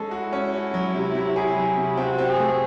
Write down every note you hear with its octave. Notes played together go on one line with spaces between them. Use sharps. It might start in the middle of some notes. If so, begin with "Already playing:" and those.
Already playing: G#3 C#4 A4
E4 F#4
C#4
F#4
F#3
C3
C3
G#4
F#3
C3
C4 F#4
C4
G#4
A3